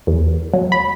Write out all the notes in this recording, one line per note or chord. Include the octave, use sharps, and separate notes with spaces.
E2
F#3
B5